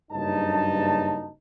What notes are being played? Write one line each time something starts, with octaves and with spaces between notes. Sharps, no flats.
F#1 G2 D#4 A5